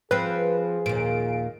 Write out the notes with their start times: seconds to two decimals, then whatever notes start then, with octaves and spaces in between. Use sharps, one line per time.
0.11 F3 C4 G#4 B4
0.86 D#2 A#2 D7